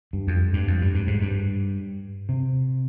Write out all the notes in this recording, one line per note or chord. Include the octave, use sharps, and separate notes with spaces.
G2
F2
G2
F2
G2
G2
G#2
G2
C3